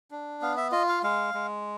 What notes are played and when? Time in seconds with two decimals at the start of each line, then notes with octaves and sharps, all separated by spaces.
0.11 D4
0.42 B3 F5
0.57 E5
0.72 F4 D#5
0.88 F5
1.03 G#3 F5
1.34 G#3